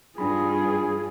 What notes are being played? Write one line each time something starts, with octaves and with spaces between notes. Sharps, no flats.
G2 D4 F4 G#4 B5